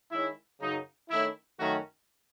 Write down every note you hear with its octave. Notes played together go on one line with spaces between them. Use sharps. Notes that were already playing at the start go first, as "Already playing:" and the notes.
D#3 G#3 C#4 E4
F#2 C#3 F#3 D#4
D#3 A3 C#4 E4
F#2 D#3 A3 C#4 F#4